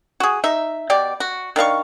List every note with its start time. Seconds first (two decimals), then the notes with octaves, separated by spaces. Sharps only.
0.20 F#4 G#4
0.44 D#4 E5
0.90 B2 G4 D5
1.20 F#4
1.56 D#3 D4 F5 C#6